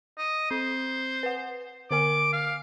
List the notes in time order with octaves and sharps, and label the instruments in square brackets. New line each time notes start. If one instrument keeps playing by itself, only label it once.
[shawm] D#5
[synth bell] C4 [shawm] C5
[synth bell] B4 F#5
[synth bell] D3 A#4 G#5 [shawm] D6
[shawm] F5